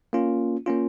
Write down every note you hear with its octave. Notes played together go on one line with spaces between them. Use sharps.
A#3 C#4 F4
A#3 C#4 F4